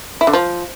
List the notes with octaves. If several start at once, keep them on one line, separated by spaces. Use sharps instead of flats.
E4
D3
F3